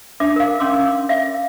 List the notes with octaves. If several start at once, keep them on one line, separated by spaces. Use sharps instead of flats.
D4 E5 D6
A#4 F5
C#4 C6 D6 E6
E5 F5